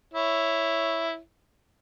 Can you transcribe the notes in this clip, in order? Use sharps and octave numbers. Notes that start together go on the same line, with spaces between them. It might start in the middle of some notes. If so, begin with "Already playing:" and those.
E4 C#5